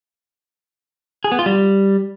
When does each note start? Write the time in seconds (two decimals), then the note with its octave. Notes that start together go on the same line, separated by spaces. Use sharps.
1.24 G#4
1.32 B3
1.39 F4
1.46 G3